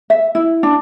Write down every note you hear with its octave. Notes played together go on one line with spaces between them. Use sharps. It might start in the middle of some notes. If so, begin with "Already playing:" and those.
E5
E4
D4